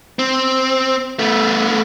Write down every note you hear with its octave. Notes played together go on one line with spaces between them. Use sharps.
C4
A3 B3